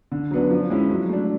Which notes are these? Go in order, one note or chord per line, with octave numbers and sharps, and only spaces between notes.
D3
F#3 B3 D4
F3
G#3 C#4 E4
F#3
A3 D4